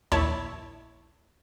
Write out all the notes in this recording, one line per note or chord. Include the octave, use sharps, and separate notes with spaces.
A#1 D#2 E4 C#5 A5